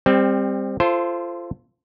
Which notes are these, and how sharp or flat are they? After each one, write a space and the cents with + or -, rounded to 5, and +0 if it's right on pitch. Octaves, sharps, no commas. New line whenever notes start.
G3 +25 C4 +0
F4 -25 A4 +0 C5 +0